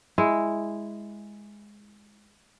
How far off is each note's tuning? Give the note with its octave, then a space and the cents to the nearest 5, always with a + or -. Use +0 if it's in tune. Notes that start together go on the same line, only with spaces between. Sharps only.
G#3 +0 E4 +0